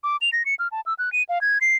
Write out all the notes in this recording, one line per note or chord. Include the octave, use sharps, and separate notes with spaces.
D6
F7
A#6
C#7
F6
A5
E6
F#6
D#7
F5
G#6
C7